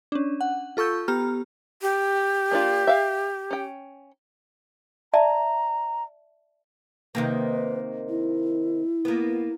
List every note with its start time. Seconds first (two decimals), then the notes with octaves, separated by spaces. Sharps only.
0.12 C#4 D4
0.41 F#5
0.77 F4 A4 C#6 E6 G6
1.08 B3 G4 A#5 F6
1.82 G4
2.51 A#3 D4 F4
2.87 E5 F5
3.51 C#4 G5
5.14 D5 E5 A5 A#5
7.15 C3 D#3 A#3 B4
8.09 E4
9.05 A#3 B3